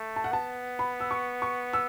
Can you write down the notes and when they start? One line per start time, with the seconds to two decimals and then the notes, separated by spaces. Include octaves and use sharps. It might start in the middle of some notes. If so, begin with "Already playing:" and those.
Already playing: A3
0.16 A5
0.24 F#5
0.32 B3 A5
0.79 B5
1.00 E6
1.11 C#6
1.42 C#6
1.73 E6